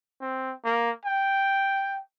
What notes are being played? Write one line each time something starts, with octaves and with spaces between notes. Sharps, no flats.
C4
A#3
G5